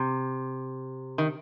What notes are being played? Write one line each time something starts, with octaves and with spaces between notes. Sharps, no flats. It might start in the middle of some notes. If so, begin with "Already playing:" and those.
Already playing: C3
D#3